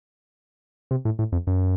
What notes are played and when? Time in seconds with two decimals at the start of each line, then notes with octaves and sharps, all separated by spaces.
0.91 C3
1.05 A2
1.19 A2
1.32 F2
1.47 F#2